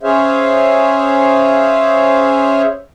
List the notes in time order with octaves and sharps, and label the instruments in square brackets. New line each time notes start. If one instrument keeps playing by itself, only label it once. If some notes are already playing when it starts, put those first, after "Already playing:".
[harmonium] C#4 G#4 C5 C#5 E5 F5